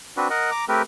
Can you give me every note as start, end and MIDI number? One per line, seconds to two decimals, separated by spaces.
0.17 0.28 60
0.17 0.28 62
0.17 0.28 66
0.17 0.28 71
0.30 0.50 70
0.30 0.50 75
0.30 0.50 78
0.51 0.65 82
0.51 0.65 86
0.69 0.82 57
0.69 0.82 60
0.69 0.82 67
0.69 0.82 70
0.69 0.82 71